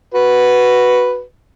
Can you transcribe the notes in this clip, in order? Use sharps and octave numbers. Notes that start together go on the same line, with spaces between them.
F#4 B4